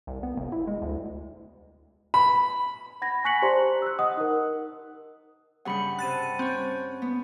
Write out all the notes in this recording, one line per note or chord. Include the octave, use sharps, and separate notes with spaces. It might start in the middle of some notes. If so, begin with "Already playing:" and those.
C2
B3
F1
E4
G#3
D2
B5
F#5 B5 G#6 A#6
G#5 C#6 F#6 B6 C#7 F#7
G4 C5 D5 A5 A#5 C6
E6 F#6
D#5 F#5 D#6
D#4 A#4
G2 C#3 G3 F#5 B5 C#7
C3 A5 F#6 A6 D#7
C4 C#4 C#5
B3